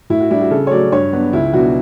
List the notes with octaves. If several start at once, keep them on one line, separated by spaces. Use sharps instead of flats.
A2 E4
F#4
G3 D4 E4
F#4
C#3 A4
C#5
F#3 A3 D5
G2 C#5
F#3 B3 D4
C#2 E4
B2 F#3 B3 D4 F#4